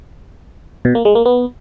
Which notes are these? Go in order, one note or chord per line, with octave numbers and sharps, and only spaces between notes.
B2
A#3
G#3
A#3
B3